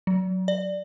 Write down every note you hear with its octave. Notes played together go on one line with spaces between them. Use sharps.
F#3
D5